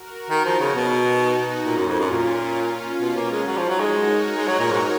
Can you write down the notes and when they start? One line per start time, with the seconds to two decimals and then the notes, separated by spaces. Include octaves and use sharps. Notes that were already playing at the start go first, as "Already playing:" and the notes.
Already playing: F#4 A#4
0.30 D#3
0.45 F3
0.60 C#3
0.75 B2 D#4 F#4
1.66 A#2 C#4 F4
1.77 F#2
1.88 F2
1.99 F#2
2.11 A#2
2.55 C#4 F4
3.01 B2
3.16 A#3
3.31 G#3
3.46 F#3 D#4 F#4
3.58 F3
3.69 F#3
3.80 G#3
3.92 A#4 C#5
4.37 G#3
4.48 F#3
4.59 A#2
4.70 G#2